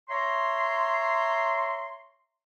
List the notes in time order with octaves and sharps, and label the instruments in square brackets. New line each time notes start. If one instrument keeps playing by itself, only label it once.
[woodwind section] C#5 E5 A#5 C6